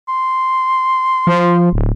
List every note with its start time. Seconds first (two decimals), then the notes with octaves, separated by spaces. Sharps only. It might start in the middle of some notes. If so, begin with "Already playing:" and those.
0.09 C6
1.27 F3
1.73 D1